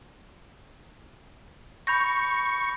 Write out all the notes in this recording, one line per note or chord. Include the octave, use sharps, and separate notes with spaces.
B5 C#6 G6 A#6